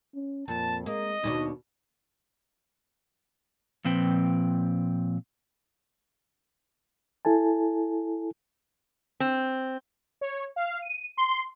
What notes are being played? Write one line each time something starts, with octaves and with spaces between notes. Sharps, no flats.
C#4
F2 A#2 A5
G#3 A#3 D#5
D#2 B2 D4 D#4
A#2 F3 C4 B4 G5
E4 A4 G#5 A5
C4
C#5
F5
D#7
C6